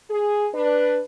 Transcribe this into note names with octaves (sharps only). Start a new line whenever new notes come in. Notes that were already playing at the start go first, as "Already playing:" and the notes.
G#4
D4 B4